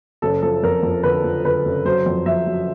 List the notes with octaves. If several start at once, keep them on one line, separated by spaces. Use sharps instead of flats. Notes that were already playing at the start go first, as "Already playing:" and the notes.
F#1 A4
F3 A4
F2 A#4
F2
D3 B4
F3
D3 B4
F#1
F#3 C5
F2
F2 E5
F#3